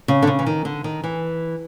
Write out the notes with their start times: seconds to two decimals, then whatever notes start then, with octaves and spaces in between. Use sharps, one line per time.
0.08 C#3
0.22 D3
0.27 C#3
0.39 E3
0.46 D#3
0.65 D3
0.84 D#3
1.04 E3